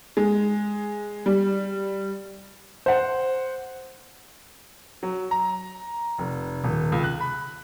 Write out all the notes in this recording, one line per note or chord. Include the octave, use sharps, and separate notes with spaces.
G#3
G3
C5 F#5
F#3
A#5
F1
D#1
C#2
F#6
B5